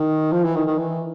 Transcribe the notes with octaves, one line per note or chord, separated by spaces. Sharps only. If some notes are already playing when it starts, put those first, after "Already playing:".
Already playing: D#3
F3
E3
D#3
D#3
E3